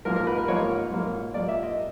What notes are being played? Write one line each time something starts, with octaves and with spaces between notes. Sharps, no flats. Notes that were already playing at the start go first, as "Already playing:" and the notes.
G#2 F3 A#3 A#4
A#4
B4
A#4
G#2 F3 A#3 C#5
G#2 F3 A#3
G#2 F3 A#3 D5
E5
D#5